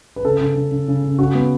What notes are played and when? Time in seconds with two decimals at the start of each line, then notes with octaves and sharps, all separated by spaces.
0.16 B4
0.25 C#3 A4
0.41 C#3
0.55 C#3
0.71 C#3
0.88 C#3
1.04 C#3
1.19 C#3 F#4
1.35 B3